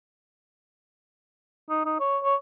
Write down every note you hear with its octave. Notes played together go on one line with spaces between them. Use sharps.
D#4
D#4
C#5
C#5